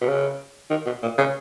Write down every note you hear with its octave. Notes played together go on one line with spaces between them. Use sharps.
B2
C#3
D#3
B2
A#2
C#3